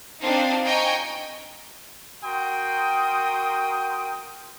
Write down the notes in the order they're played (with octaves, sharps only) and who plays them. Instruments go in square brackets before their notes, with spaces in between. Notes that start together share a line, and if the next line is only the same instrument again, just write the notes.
[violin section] C4 D4 D#4 F4 C5
D#5 G5 G#5 A#5 C#6
[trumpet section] F#4 A#4 G5 C6 D#6